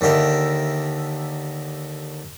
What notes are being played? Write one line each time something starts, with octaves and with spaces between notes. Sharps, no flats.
D#2 D3 G4 A#4 E5